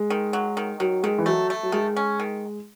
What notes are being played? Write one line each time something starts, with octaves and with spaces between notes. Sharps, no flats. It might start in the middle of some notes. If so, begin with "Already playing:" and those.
Already playing: G#3
D#3
F#3
D#3
D#3 F#3
D#3 G#3
E3
F#3 A3
A3
F#3
D#3 G#3
C#4
D#3